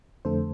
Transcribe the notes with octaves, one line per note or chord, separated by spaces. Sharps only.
F2 D3 A3 A4 C5